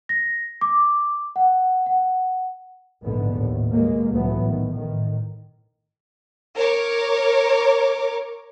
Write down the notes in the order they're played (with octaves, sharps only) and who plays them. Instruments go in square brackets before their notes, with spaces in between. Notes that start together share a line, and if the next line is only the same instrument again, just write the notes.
[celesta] A#6
D6
F#5
F#5
[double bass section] A#1 E2 G#2 D3 B3
D#2 A2
B2 G#3 A#3
C#2 A2 E3 F#3 A3 B3
A#1 D#3
A2 D#3
[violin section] A#4 C#5 D6